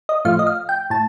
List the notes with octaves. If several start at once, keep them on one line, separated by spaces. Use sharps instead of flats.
D#5
A2 F3 A3 F5
D#5
F5
G5
A2 A5